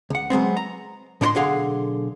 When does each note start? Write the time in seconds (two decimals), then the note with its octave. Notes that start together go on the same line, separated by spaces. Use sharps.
0.10 C#2 F#5
0.30 F#3 G#3 B3 C4
0.57 A#5
1.21 A2 D4 D#4 C#5 D#5 C6
1.35 B1 B2 D3 G#4 F5 F#5